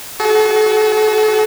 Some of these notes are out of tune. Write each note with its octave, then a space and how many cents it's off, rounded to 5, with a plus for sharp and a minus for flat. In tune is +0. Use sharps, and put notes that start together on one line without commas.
F#4 +25 A4 -40